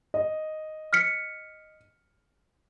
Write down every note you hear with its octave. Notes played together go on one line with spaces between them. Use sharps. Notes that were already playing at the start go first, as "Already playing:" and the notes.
D#5
F6 B6 C#7